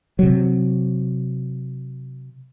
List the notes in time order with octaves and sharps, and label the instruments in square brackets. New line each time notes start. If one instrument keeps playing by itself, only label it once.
[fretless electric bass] C3 F#3